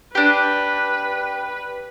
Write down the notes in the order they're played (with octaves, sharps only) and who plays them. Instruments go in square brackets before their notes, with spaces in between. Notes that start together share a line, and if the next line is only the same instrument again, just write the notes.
[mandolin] D4 G4 [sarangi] B4